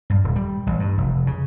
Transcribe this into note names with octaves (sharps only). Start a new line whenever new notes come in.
G2
D#1
G3
A1
G2
F1
C#3